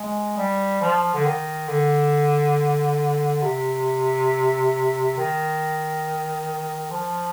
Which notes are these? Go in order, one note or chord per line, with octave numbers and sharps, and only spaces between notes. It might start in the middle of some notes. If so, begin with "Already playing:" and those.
Already playing: G#3
G3
F3
D3
D#3
D3
C3
D#3
F3